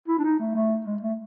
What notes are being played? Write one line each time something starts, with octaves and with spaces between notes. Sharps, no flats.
E4
D4
D#4
A3
A3
G#3
A3